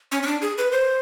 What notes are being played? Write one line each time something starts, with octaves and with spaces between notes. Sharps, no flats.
C#4
C#4
D4
G#4
B4
C5